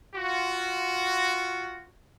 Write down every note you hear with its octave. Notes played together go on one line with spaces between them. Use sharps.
F4 F#4